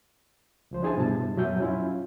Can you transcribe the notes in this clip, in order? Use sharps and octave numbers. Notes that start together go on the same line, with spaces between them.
C#2 F3 C5
D4 E4 G#4 C5 G#5 A5
G2 B2 E4 A5
F#2 B2 F#3 E5 G6
C#4 E4 F4